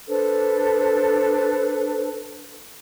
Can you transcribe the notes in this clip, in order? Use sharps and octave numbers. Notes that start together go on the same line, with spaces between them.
D4 A4 B4 C5